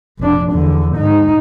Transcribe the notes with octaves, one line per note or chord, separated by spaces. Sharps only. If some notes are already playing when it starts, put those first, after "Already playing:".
F1 D4
E2 D3
G#2 D#4